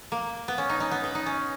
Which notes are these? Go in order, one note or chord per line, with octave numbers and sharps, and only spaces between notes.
A#3
B3
C#4
D#4
D#4
B3
B3
D#4
C#4